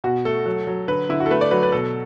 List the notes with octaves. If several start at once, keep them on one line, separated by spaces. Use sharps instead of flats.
B2 F#4
A3 A4
F#3
F#3
D3 B4
D3 E4
F#4
A4
A3 B4
D5
F#3 B4
B4
B2 A4